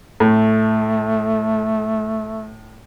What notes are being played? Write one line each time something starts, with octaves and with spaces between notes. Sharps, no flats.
A2 A3